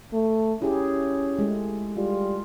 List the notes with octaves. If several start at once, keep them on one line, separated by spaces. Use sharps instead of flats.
A3
C#4 E4 G4 G#4
G#3 A3
G3 F4